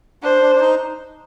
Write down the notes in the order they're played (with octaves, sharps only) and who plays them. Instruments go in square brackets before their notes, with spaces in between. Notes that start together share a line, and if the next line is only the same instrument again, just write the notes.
[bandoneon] D4 [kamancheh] C5
[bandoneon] D4
D4
D#4